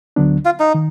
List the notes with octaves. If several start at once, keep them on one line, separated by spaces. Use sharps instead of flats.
D2 D3 F#3 B3 D4
F4
D#4
D#3